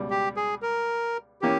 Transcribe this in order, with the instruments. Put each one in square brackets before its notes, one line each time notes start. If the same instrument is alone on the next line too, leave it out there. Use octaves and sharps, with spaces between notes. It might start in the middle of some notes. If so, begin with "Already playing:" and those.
Already playing: [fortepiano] C#2 B2 G3
[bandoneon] G4
G#4
A#4
[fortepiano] E3 A#3 C#4 [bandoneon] G4